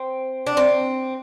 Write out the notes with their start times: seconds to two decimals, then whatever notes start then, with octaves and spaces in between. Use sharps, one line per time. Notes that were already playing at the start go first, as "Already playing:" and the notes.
Already playing: C4
0.46 D4
0.57 C4